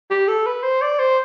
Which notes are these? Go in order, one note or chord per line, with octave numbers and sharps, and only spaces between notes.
G4
A4
B4
C5
D5
C5